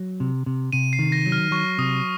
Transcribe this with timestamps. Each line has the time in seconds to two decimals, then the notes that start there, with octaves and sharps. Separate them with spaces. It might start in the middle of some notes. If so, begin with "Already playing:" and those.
Already playing: F#3
0.20 C3
0.46 C3
0.73 C3 D#7
0.93 C7
0.99 D#3
1.12 A#6
1.26 F#3
1.32 F6
1.51 F#3 C#6
1.78 C3 D#6